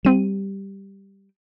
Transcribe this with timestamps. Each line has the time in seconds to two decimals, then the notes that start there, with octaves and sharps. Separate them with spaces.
0.05 G3 C4 D#7